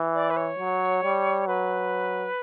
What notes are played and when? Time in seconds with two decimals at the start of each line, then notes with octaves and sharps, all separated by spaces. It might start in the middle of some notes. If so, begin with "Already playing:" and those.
Already playing: E3
0.15 D5
0.30 B4
0.37 C#5
0.59 F#3
1.04 G3
1.47 F#3 B4